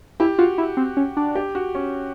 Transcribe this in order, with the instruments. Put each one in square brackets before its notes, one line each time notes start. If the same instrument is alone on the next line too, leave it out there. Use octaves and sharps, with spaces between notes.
[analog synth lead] E4 [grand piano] G4
[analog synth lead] F4 [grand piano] F#4
[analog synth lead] E4
C4
C#4
D4
[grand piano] G4
F#4
C#4